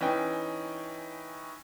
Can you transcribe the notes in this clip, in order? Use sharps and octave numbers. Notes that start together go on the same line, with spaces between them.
E3 C#4 D#4 G5